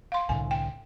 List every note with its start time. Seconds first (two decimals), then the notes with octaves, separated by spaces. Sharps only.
0.12 F5 C6
0.29 C2 A2 D3 G#5
0.51 G5